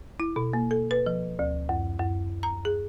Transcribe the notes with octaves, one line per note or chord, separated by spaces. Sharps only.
E4
B2
A#3
A4
B4
F3
D2
F#2
F#2
A#5
G#4